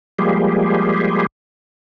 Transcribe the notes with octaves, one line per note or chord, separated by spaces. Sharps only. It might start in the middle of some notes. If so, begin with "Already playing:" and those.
F3 G3 G#3 A#3 G4 G#4